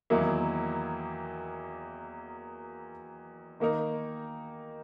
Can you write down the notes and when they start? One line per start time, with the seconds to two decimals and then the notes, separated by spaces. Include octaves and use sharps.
0.10 E2 D#3 F#3 A#3 E4
3.60 D#3 A#3 D#4 A#4